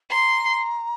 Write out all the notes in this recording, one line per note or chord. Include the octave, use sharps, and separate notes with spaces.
A#5 C6